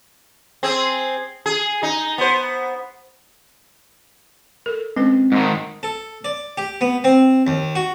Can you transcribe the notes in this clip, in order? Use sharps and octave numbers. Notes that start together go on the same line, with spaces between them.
C4 G#4
G#4
D#4
B3 C5
A4 A#4
G#3 C4 C#4 B4
G#2 D#3
A4
D5
G4
B3
C4
D#2
F#4